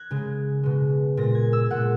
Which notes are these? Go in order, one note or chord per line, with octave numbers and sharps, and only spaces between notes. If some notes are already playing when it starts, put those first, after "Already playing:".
Already playing: F#6 G#6 A#6
C#3 G#3
B2 G#3
A#2 G#3 A#6
G#6
E6
A#2 G#3 F#5